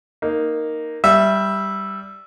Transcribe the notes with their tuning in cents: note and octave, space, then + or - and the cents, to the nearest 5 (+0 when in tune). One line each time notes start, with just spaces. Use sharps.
A#3 +0 D#4 +0
G3 +0 E5 +0